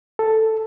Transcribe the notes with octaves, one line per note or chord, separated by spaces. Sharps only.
A4